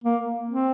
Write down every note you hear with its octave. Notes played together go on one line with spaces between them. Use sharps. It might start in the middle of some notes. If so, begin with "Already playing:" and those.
A#3
C4